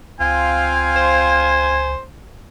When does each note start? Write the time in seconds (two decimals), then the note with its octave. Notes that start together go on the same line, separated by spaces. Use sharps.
0.20 C#2 C4 F4 F5 G#5
0.96 C5